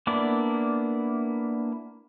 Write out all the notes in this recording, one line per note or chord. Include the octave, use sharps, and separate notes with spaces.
A#3 B3 D4 E4 D5